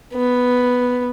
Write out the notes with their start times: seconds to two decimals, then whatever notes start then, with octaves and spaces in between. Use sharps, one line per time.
0.14 B3